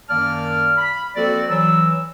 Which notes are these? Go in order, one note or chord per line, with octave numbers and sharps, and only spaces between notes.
F#2 D#3 A#3 D5 A5 F6
B5
F3 A#3 C4 F#4 A4 D5
E3 F#3 E6